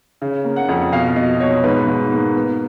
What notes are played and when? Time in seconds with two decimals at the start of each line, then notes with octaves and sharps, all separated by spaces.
0.22 C#3
0.44 A#3
0.56 F#5
0.69 F2
0.92 B2 F5
1.16 B2 D#5
1.40 B2 C#5
1.64 G#2 B4
1.87 G#2
2.12 A#3
2.36 B3